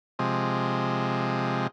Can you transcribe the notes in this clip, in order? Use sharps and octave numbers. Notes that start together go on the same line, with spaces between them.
C3 F3 G#3